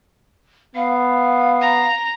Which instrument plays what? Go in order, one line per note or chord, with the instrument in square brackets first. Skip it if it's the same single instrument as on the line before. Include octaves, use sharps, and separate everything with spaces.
[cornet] B3 [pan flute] F5
[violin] A#5